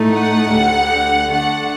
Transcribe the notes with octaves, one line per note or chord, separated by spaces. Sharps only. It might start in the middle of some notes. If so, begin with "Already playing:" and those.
Already playing: A2 A3 D#4
F#5
D2 D3 G3
D3 A3 D4 F#5